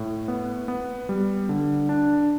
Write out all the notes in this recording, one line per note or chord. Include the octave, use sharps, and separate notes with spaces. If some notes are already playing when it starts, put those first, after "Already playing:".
Already playing: A2
B3
B3
G3
D3
D4